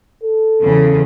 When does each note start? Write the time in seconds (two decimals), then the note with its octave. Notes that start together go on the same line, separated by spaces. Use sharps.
0.24 A4
0.63 E2 C#3